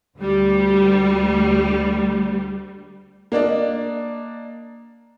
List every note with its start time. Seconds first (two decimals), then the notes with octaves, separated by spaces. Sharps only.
0.16 D2 G3
3.32 A#3 D4 D5 D#5